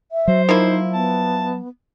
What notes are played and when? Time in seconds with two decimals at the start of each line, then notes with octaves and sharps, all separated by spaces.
0.12 E5
0.28 F#3 C5
0.49 F3 A#3 D#4 E4
0.93 B3 A5